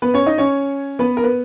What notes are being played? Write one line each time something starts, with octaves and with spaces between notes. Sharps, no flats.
B3 B4
C#4 C#5
D#4 D#5
C#4 C#5
B3 B4
A#4
B3 B4